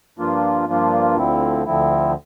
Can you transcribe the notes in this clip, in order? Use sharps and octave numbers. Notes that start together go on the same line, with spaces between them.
G2 F3 A#3 D4 F4
G2 F3 A#3 D4 F4
D2 D3 F3 C4 E4
D2 D3 F3 C4 E4